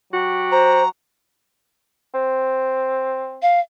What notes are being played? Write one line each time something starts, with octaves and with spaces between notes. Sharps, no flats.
F#3 F#4 G4
C5 A#5
C4
F5